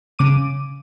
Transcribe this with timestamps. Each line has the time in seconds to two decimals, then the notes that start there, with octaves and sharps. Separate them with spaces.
0.19 C#3 D6 D#7